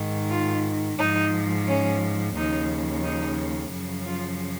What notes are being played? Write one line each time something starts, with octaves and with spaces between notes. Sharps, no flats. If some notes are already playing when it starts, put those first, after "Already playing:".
Already playing: G#2 D#3
F4
G#2 F3 D#4
C#4
D#2 C#3 F3 D#4
D#4
F#2 C#3 F3
F4